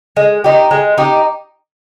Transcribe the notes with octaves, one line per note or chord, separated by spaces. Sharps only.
G#3
D#4 G4
G#3
D#4 G4